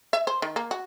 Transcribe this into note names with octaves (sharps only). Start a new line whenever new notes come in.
E5
C5
D#3
A#3
F#4